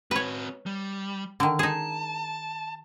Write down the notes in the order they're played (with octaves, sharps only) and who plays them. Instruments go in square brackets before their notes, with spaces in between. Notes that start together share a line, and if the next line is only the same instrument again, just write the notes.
[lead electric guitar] C4 F#4 [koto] B4 C#5
[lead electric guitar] G3
[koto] D3 D#3
[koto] D#4 G#4 [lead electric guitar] A5